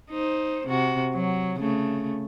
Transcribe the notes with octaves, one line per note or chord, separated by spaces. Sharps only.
D#4 C5
C3 F#4
F#3
C#3 A3